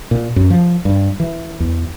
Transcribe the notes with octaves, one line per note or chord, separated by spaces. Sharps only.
A#2
F#2
F3
G2
E3
E2